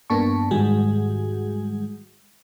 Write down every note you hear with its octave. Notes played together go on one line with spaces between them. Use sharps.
G2 A#3 B3 D4 A5 C#6
G#2 D#3 G3 G#3 F#4 G#4